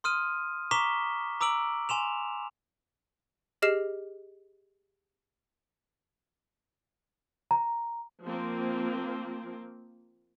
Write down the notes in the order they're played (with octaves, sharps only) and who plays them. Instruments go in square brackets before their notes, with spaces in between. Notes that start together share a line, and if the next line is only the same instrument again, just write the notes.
[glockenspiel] C6 D#6 F6 D#7
A#5 C#6 D6 B6 E7 G7
A#5 D6 E6 D7 F#7
G#5 C6 E7 F7
[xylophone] G4 G#4 D#5 F6 C7 E7
[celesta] A#5
[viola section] F3 A#3 C4